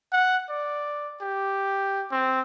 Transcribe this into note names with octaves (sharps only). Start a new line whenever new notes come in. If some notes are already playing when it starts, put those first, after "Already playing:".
F#5
D5
G4
C4